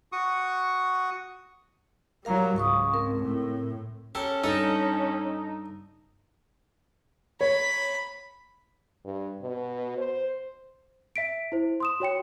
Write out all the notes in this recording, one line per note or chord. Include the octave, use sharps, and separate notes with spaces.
F#4 C#6 D#6
F#3 G3 A#4 F5 A#5
C#2 G#2 F5 C#6 D#6
C4 A#4
A2
C#4 G4 A4 A#4
G2 D#4 A4 A#5
C#5 B5
G2
B2
C5
E5 B6 D7
E4 C5
C6 D#6 E7
F#4 C#5 G5 C#7